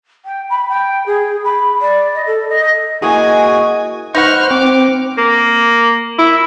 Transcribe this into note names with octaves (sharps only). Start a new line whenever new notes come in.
G5
B5
G5
G#4
B5
D5
D#5
A4
D#5
A#3 E4 F#4 G#4 D#5 G#5 D#6
D#4 B4 C5 F#5 C#6 F6
C4 D6
A#3
E4